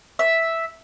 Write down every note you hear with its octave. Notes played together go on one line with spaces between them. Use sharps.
E5